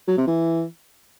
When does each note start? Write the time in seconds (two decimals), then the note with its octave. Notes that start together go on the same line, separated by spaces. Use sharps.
0.08 F#3
0.18 C3
0.27 E3